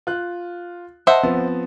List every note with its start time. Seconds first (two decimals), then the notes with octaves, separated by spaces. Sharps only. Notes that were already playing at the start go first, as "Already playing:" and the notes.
0.07 F4 F#6
1.07 C5 D#5 E5 F#5 A5
1.23 F3 B3 C4